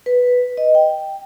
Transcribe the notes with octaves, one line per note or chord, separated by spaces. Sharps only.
B4
D#5
G5